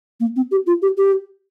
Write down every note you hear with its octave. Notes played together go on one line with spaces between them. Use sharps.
A#3
C4
G4
F4
G4
G4